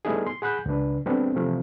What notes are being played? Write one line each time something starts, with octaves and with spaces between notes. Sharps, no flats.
G3 A3 B3 D#4 E4 G#4
C6
G#4 F#5 B5 F#6 G6
C#2 C#3 D4 B4
G3 A3 B3 C4 D4 G4
C3 E3 F3 A3 C4